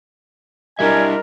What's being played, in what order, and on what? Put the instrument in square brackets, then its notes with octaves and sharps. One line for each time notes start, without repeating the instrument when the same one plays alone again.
[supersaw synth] G3 D4 [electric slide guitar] E4 G4 E5 [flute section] A#4 D#5 [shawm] G#5